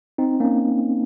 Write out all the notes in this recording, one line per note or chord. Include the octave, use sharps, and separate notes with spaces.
C4 D#4
A#3 C#4